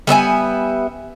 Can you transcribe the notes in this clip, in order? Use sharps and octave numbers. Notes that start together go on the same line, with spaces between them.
G3 B3 E5 G#5